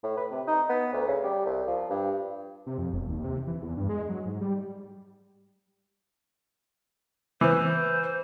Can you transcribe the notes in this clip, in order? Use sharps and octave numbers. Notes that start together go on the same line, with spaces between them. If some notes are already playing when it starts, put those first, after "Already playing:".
A2
B4
C3
D#4
B3
D2
C#3
G3
C2
F3
G2
C3
F2
E1
D#2
C3
E3
E2
G2
G#3
F#3
G#2
G3
E3 C5